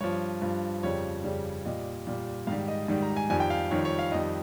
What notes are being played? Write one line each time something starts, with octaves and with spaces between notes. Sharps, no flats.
G2 F3 C#5
G2 F3
F2 C#3 G3 C#5
F2 C#3 G3
A#2 G3 D#5
A#2 G3
G#2 D#3 G3 F5
D#5
G#2 D#3 G3
A#5
G#5
F2 D#3 G3 G#5
G5
F5
F2 D#3 G3 C#5
C#5
F5
F2 D#3 G3 D#5